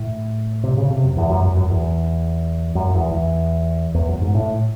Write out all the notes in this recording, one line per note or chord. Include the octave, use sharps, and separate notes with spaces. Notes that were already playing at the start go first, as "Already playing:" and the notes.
Already playing: A2
C3
C#3
C3
F#2
E2
F#2
F#2
F#2
E2
F#2
E2
E2
E2
F#2
G#2
A2